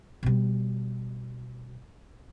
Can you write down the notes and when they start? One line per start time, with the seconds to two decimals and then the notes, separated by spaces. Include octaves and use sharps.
0.23 B2 G3